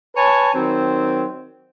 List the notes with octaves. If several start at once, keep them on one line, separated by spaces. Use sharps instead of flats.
B4 C#5 G#5 A5
D#3 F#3 C4